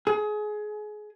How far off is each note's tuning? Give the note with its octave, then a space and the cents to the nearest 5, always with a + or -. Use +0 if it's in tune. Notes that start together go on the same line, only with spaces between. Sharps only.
G#4 +25